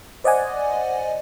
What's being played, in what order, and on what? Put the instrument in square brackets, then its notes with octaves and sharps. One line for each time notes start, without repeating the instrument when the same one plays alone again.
[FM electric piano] C5 D5 D#5 F#5 G#5